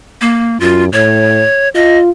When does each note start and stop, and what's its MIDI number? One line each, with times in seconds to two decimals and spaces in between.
0.21 0.58 58
0.60 0.89 42
0.60 0.85 65
0.93 1.43 45
0.93 1.69 73
1.75 2.10 65
1.75 1.98 75